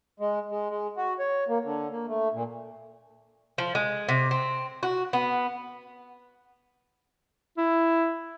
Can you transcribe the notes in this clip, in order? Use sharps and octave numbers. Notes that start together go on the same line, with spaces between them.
G#3
G#3
G#3
F#4
C#5
A#3
D3
A#3
A3
A#2
F3
G#3
C3
C4
F#4
B3
E4